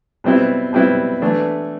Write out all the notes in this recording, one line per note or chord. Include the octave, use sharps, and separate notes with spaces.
B2 G3 C4 E4 B4
B2 G3 C4 E4 B4
E3 A3 D4